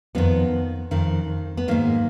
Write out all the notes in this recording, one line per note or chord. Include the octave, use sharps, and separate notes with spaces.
F2 D#3 B3
F2 D#3
B3
G#2 D#3 A#3